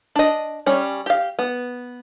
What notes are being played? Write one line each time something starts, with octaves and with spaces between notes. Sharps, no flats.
D4 D#5
G3 C#4 C#5
G4 F5
B3